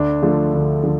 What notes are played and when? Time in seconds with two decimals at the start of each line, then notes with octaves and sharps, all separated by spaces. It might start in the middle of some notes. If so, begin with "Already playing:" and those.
Already playing: D2 D4
0.22 D3 F3 A3
0.54 D2
0.83 D3 F3